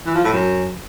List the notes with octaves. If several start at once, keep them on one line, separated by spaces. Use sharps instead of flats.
E3
F3
A2
F#2